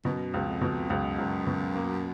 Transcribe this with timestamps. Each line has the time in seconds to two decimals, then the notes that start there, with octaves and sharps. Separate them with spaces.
0.05 F#2 B2
0.34 C#2
0.47 F2
0.61 B2
0.90 C#2 F#2
1.19 C#2
1.47 B2
1.75 A#3